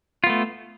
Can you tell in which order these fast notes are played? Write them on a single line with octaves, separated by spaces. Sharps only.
F4 B3 A3